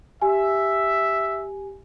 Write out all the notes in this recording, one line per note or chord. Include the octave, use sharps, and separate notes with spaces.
G4 E5 G#5